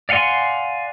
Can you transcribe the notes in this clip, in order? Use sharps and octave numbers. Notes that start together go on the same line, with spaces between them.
D5 F5 F#5 G#5 C6